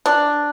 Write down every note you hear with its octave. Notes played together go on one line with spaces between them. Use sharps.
D4